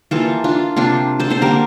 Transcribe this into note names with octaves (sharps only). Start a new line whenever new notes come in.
E3 G3 A#3 F4 A4
D4 F4
C3 G3 A#3 D4 F4
A4 C5
A4 C5
D3 G3 A#3 G4 A#4